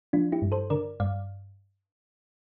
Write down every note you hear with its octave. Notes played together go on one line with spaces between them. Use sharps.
F3 D4 F4
E4 G4
G2
A4 C5
D3 A#4 D5
G2 D5 F5